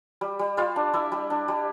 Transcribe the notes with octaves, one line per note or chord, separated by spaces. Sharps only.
G3
G3
G3 F4 F5
D4
G3 E4 E5
G3
D4
G3